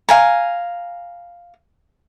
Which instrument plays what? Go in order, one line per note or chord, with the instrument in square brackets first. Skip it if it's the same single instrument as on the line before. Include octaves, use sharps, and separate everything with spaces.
[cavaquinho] F5 G#5 A#5